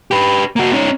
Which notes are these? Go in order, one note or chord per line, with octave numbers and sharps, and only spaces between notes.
G4 B4
A#3 F#4
C#4 D#4